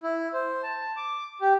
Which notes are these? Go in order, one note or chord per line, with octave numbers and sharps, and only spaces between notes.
E4
C5
A5
D6
G4